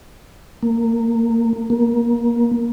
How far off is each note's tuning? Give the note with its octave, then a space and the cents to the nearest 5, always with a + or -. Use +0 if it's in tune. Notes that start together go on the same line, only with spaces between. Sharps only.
A#3 -20
A#3 +20